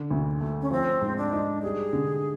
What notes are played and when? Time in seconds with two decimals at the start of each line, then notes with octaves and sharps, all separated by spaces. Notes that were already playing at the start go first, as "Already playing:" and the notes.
Already playing: D3
0.11 D2
0.41 A3
0.62 C#4
0.71 F3 C4
1.01 G#2
1.18 D4
1.33 D#4
1.62 G3 G#4
1.93 D3